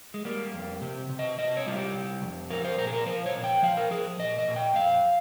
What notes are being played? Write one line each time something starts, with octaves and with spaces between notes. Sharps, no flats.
G#3
G3 A#3
F2
C3 G4
C3
D#5
C3 D#5
C#5
G3 F4
G4
C3
F2
F3 A#4
C5
A#2 A#4
G#4
A#4
F3 C5
C#5
A#2
G5
F3 F5
A#4
F3 G#4
A#2 D#5
D#5
A#2
G5
F2 F5